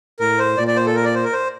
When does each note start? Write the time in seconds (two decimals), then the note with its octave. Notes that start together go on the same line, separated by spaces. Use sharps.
0.20 A2 A#4
0.39 C5
0.57 A#2 D5
0.67 D5
0.76 C5
0.86 A4
0.95 A#4
1.05 D5
1.15 C5
1.24 A#4
1.33 C5